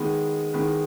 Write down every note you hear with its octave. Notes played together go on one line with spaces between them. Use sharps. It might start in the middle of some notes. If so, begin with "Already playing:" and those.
Already playing: D#3 G#3 B3
D#3 G#3 B3